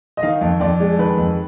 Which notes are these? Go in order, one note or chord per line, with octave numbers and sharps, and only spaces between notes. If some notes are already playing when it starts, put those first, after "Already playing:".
D#5
D#3 F5
F2
F2 D5
G#3
D#3 B4
F2